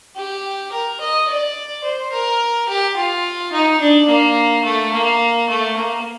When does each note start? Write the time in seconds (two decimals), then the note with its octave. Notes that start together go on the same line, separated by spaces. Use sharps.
0.16 G4
0.72 A#4
1.01 D#5
1.28 D5
1.84 C5
2.12 A#4
2.68 G4
2.96 F4
3.52 D#4
3.80 D4
4.08 A#3
4.64 A3
4.93 A#3
5.49 A3
5.77 A#3